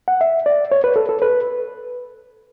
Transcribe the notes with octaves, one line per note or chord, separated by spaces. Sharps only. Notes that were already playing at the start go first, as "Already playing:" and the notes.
F#5
E5
D5
C#5
B4
A4
A4
B4